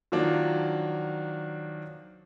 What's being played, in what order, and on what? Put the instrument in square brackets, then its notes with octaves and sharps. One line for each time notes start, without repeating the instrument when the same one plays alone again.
[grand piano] D#3 F3 F#3 A#3 D4